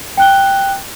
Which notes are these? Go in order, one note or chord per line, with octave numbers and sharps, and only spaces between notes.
G5 F#6 G7